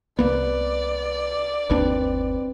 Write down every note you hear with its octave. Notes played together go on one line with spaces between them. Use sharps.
C2 A#3 B3 B4 D5
G1 D#2 C4 D4 B4